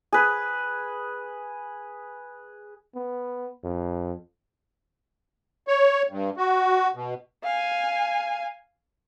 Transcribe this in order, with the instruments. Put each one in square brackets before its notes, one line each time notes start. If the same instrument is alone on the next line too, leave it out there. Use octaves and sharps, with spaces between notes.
[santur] G#4 B4
[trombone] B3
F2
[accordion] C#5
G2
F#4
B2
[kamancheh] F5 G#5